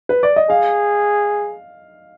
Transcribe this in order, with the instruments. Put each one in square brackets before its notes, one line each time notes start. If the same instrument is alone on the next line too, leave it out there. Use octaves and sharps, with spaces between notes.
[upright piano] B4
D5
D#5
[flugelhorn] G#4 [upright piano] F5